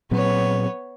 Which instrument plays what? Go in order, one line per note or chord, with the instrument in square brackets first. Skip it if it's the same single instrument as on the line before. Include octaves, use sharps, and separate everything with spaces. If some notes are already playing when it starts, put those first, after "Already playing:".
[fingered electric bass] A#2 F#3 C4 [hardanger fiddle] B3 C#5